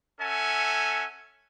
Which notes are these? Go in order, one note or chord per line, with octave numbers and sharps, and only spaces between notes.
C#4 A4 E5 F#5 G#5